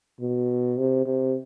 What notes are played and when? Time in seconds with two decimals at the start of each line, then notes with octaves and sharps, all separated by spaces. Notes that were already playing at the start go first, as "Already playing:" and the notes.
0.21 B2
0.78 C3
1.06 C3